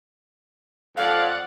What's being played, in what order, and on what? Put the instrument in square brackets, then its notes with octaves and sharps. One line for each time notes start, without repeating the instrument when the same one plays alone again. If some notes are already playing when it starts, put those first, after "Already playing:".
[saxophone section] F2 [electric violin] D5 F#5 [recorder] F5